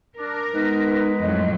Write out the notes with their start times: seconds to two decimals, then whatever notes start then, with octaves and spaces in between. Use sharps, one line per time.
0.18 D4 A#4
0.54 G#3 B3 D#4 B4
1.22 F2 A2 F#3 D#5